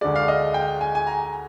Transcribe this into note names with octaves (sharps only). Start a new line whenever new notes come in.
D2 D3 G#3 D5
F5
D#5
G5
G#5
G#5
A#5